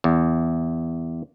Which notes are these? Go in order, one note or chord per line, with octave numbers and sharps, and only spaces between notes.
E2